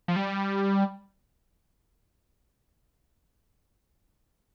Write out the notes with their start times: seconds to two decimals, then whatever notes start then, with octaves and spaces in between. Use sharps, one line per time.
0.08 F3
0.16 G3